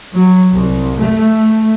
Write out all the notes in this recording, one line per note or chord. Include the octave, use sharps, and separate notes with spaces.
F#3
C2
A3